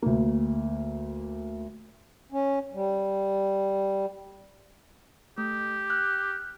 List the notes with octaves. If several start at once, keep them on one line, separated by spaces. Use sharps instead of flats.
D2 A#3
C#4
G3
A3 G4
F6 F#6